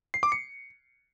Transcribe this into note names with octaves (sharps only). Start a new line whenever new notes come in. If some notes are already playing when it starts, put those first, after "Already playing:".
C7
D6
C#7